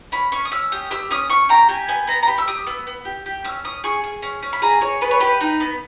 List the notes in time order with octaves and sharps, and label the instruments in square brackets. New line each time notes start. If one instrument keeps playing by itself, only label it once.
[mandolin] C#4 B5
C#4 C#6
D#6
C#4 E6
G4 D#6
G4 E6
C#4 D#6
C#4 C#6
G4 A#5
G4 G#5
B3 G#5
B3 A#5
A#5
G4 B5
E6
G4 D#6
B3 E6
B3
G4
G4
C#4 E6
C#4 D#6
G#4 C#6
G#4
C#4
C#4
B5
G#4 A#5
G#4 C#5
B3 B4
C#5
G4 B4
D#4
B3